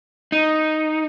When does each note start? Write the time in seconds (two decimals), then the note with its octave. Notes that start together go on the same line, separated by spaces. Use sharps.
0.32 D#4